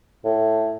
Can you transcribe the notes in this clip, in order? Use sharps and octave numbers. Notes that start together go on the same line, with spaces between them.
A2